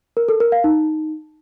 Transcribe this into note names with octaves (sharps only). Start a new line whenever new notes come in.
A#4
A4
A#4
F5
D#4